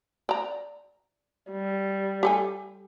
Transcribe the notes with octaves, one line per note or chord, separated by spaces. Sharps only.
D5 A#5
G3
G4 A4 G#5